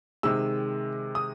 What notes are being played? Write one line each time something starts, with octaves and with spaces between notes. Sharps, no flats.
C3 D#3 G#3 E6
D#6